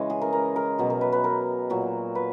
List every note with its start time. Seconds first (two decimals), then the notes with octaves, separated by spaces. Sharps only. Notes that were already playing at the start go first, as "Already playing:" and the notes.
Already playing: C#3 E3 G#3
0.10 G#4
0.21 A#4
0.33 A#4
0.56 A#4
0.79 B2 F#3
0.90 A#4
1.01 B4
1.12 B4
1.24 A#4
1.70 A#2 F#3
2.15 B4